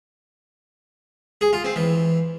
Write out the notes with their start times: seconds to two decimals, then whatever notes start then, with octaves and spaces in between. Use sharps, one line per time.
1.41 G#4
1.53 F4
1.64 C4
1.76 E3